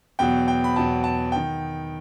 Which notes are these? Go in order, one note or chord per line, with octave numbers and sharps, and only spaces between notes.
E2 B2 F#3 G5
G5
B5
E2 B2 F#3 A5
A5
D#3 G5